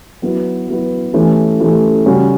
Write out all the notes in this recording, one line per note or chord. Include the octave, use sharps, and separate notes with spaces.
F#3 B3 E4 B4
F#3 B3 E4 B4
E3 A3 C#4 G4
E3 A3 C#4 G4
C#3 G3 C#4 F#4